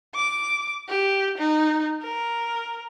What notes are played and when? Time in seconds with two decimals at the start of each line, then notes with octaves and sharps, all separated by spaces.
0.14 D6
0.89 G4
1.38 D#4
2.02 A#4